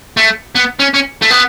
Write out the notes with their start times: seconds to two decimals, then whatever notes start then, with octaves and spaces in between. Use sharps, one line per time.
0.17 A3
0.55 B3
0.79 C#4
0.94 C#4
1.22 A3
1.30 B3